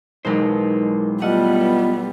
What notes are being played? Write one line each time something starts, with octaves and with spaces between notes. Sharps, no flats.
E1 B1 G#3 D#4 A#4 C5
G3 A3 B3 F4 D#5 F#5